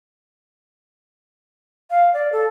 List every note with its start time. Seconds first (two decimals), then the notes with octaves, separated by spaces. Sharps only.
1.90 F5
2.14 D5
2.32 A4